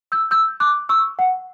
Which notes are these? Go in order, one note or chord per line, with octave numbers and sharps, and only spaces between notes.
E6 G6
E6 G6
D6 F#6
C#6 E6
F#5